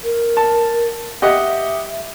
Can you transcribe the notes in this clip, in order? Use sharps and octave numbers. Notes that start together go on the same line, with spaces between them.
A#4
A5
G4 D#5 E5 F#5